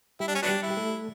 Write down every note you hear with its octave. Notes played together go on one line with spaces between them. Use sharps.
G3 E4 G4
D4
C#4
F#3 B3 D4
G3 G4
E4
G4
A3 A4